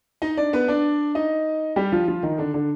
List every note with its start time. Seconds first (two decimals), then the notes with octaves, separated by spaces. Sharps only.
0.22 D#4 D#5
0.37 D4 D5
0.53 B3 B4
0.68 D4 D5
1.15 D#4 D#5
1.76 G3 G4
1.92 F3 F4
2.08 F3 F4
2.23 D#3 D#4
2.38 D3 D4
2.54 D3 D4